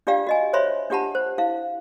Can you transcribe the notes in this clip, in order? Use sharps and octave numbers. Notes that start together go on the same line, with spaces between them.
D4 F4 G4 D5 F5 G5
F#4 D#5 G#5
C5 C#5 E5 B5 C6
D4 F4 G4 F#5 A5 B5
C5
E4 F5